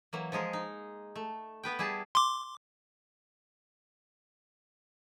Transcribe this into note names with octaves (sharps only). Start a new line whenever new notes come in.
E3 F#3 A#3
F3 G#3 G#4 A#4
D#4
A3
B3 B4 G5
G3 E4 G#4 A5
C6 D6